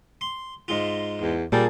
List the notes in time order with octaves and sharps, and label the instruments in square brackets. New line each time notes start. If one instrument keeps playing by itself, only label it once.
[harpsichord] C6
G#2 G#3 F4
[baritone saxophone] E2
[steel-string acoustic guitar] A#2 G#4 A5 [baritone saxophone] G3 [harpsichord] A#3